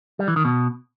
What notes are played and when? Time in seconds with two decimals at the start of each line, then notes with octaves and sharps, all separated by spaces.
0.19 G3
0.28 E3
0.36 D#3
0.45 B2